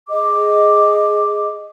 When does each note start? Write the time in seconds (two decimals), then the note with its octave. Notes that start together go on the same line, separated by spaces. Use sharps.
0.09 G#4 D#5 D6